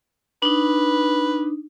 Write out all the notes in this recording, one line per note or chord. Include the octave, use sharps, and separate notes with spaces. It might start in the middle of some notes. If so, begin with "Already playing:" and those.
D4 D#4 B4